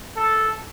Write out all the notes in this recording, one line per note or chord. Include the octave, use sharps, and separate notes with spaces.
A4